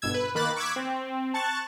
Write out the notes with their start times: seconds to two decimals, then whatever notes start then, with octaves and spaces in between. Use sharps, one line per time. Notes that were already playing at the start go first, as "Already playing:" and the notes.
0.02 G1 B2 E6 G#6
0.14 B4
0.35 D#3 A#3 B5 F#6 A6
0.56 C#6 D6 E6 F#6 G#6 B6
0.76 C4
1.34 A5 C#6 F#6 A6